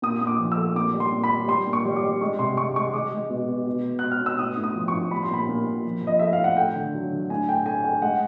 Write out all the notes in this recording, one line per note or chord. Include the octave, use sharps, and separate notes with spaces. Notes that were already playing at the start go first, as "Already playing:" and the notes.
A#2 D#6
A#2 D#6
D6
F3
E6
A3
A#2 D6
G3
C6
A#2
B5
G3
G3 C6
A#2
C#6
G3
D6
G3
G#3 C#6
C3 C6
G#3 C#6
G#3 C#6
G#3 D6
G#3
B2
B2
B2
G#3
B2 F#6
F6
B2 E6
A2 D#6
A2
D#6
F3
C#6
A2
G3 B5
C6
A#2 B5
A#2
A#2
F3
F3 D#5
A3 E5
F5
A2
F#5
A3 G5
D3
F#3
D3
A2 G#5
A3 G5
A3 G#5
A3 G5
G#3 F#5